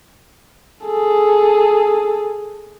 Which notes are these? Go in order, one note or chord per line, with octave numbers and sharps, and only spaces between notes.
G#4 A4